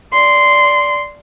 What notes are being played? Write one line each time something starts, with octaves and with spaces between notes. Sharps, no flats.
D5 C6